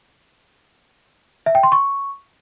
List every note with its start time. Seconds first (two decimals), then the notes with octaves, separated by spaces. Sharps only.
1.46 E5
1.55 G5
1.63 C6
1.72 C#6